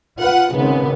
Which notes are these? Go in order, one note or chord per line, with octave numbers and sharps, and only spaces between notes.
F4 B4 F#5
G#1 C#3 B3